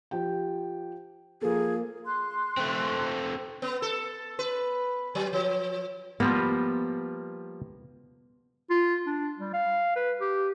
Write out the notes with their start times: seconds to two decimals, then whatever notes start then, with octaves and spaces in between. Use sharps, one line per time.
0.11 F3 G4 G5
1.42 F3 A#3 G#4 A4
2.05 C6 F#6
2.57 A3 C4
3.62 B3
3.82 A4
4.39 B4
5.15 F#3
5.33 F3
6.20 F3 G3 A#3 B3
8.70 F4
9.07 D4
9.39 G3
9.54 F5
9.96 B4
10.21 G4